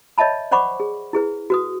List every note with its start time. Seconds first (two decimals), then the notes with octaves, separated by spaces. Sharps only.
0.18 C#5 D#5 E5 A5 B5
0.51 C5 D5 F#5 B5 C#6 D6
0.80 G#4
1.13 E4 G#4 B4
1.50 F#4 B4 D#6